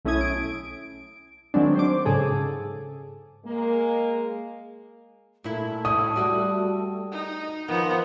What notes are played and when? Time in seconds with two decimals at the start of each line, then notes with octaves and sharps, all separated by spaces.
0.05 B1 A3 C#4 E4 D#6 G#6
0.21 D7
1.54 D#3 F#3 G#3 C4 D4
1.76 C5 D6
2.06 G#2 C#3 G#4 A4
3.45 G#3 A#3
5.44 A#2 A3 E4
5.85 A2 E4 D#5 D#6
6.16 G3 F#4 D#5
7.11 D#4
7.68 D#3 F3 B3 D#4